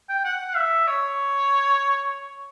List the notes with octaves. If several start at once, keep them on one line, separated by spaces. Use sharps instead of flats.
G5
F#5
E5
C#5